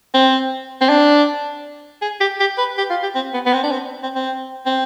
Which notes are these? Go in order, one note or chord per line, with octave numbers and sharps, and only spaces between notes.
C4
C4
D4
G#4
G4
G4
B4
G4
F4
G4
C4
B3
B3
C4
D4
C4
C4
C4
C4